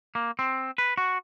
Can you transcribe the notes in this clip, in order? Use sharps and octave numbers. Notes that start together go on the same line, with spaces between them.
A#3
C4
B4
F#4